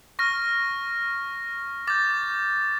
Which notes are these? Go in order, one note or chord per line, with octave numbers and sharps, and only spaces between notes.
C#6 F6 A#6
D6 G6 A6